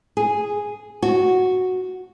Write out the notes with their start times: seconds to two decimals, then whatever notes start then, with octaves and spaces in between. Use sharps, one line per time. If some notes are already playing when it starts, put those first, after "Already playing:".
0.17 G#4
1.02 F#4